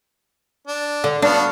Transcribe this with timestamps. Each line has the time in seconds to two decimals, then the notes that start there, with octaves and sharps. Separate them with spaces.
0.67 D4
1.04 D3
1.22 B3 D4 F#4 F5